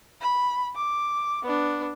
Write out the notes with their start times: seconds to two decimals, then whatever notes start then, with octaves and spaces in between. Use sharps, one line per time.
0.21 B5
0.76 D6
1.42 B3 D4